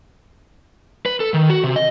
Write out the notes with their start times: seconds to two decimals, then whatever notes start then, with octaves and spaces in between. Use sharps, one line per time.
1.06 B4
1.20 A4
1.34 D#3
1.50 F#4
1.64 C3
1.76 D#5